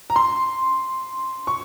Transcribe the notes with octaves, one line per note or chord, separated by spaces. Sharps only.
A#5
C6
C#6